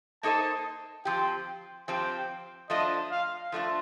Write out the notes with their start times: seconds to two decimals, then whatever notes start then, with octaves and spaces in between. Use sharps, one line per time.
0.23 A#3 D#4 A4 C5 D#5 A5
1.05 F3 C4 G4 G5
1.88 F3 C4 G4 G5
2.70 F3 A3 D4 F4 D#5
3.11 F5
3.52 F3 A3 D4 F4